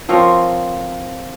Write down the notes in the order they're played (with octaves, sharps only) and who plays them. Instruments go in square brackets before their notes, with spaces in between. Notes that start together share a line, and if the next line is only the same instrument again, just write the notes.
[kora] F3 C4 A#4 C#5